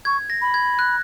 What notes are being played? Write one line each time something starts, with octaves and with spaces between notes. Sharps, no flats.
C#6 G#6
A#6
B5
G#6
F#6